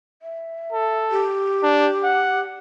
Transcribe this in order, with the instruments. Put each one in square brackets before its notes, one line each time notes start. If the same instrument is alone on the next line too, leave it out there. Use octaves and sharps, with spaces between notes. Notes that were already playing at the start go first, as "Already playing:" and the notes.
[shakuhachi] E5
[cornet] A4
[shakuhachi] G4
[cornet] D4
F#5